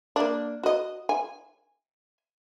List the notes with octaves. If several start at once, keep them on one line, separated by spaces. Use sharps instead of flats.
A#3 D4
F#4 D#5
G#5